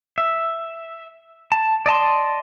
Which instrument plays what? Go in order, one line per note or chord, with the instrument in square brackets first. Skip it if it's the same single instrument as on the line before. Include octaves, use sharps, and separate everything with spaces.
[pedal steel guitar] E5
A5
D5 D#5 A5 C6